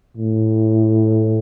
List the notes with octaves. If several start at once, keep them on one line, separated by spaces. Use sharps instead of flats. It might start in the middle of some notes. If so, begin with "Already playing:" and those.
A2